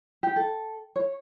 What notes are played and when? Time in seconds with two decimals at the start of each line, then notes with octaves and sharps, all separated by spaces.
0.23 G4
0.36 A4
0.96 C#5